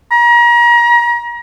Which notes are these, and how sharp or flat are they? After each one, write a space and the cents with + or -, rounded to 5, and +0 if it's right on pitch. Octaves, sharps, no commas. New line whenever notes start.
A#5 +35